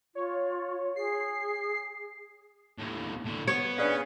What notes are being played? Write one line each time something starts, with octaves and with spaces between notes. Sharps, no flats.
F4 C#5
G#4 C7
D#2 A2
A2 D3
B3 C#5
C#4 D4 G#4 B4 D5 F5